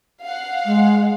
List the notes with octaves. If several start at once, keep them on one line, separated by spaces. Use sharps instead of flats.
F5 F#5
G#3